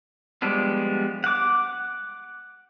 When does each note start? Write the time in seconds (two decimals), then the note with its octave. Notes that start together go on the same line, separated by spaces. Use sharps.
0.42 F3 G3 G#3 B3 D4
1.24 F#5 D6